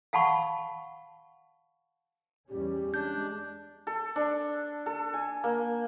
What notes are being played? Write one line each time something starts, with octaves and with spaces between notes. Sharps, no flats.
F5 F#5 A5 B5 C#6
E2 G3 C#4 G4
G#3 D4 G6
A4
D4
A4
G#5
A#3